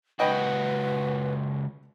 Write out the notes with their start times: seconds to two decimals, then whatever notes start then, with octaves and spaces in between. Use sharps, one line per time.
0.20 C#2 F#4 B4 D#5 G5 B5